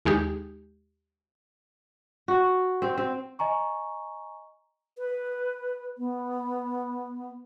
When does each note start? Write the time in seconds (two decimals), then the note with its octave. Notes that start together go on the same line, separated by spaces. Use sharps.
0.05 D#2 G#3 D#4 G4
2.28 F#4
2.82 C4
2.98 C4
3.39 D#5 G#5 A#5 C#6
4.98 B4
5.98 B3